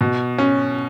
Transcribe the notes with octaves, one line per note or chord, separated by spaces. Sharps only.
B2
C#4